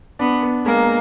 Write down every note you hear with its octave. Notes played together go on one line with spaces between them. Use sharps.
B3 D4
B3
G#3 A#3